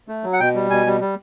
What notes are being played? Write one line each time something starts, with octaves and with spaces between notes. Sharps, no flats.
A3
F#3
F#5
B2 G5
G3
B2 G#5
G3
G3